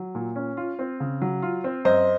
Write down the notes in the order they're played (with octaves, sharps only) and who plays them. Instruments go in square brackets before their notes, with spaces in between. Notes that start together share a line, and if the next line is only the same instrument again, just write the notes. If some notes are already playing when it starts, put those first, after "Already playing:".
Already playing: [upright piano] F#3
A#2
C#4
F4
C4
C#3
F#3
F4
C4
[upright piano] F#2 [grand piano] C5 D#5